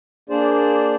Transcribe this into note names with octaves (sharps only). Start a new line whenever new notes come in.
A#3 D4 G#4 C5 D5